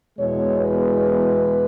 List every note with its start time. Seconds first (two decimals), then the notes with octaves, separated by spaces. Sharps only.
0.17 E2 B2 G#3 C#5
0.60 B4